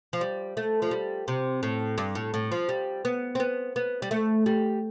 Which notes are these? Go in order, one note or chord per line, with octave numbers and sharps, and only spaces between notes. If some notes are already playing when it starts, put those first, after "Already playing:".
F3
G3
A3
F3
G3
C3
A2
G2
A2
A2
F3
G3
B3
C4
B3
B3
G3
A3
G3